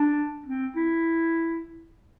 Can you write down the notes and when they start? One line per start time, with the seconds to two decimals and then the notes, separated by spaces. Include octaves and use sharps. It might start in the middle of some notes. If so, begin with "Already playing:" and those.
Already playing: D4
0.46 C4
0.76 E4